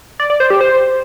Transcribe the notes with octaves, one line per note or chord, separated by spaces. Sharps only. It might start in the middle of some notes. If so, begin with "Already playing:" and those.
D5
D5
C5
G4
C5